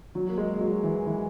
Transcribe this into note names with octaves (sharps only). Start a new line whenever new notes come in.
F#3
A#3
G#3
F#3
E3
E3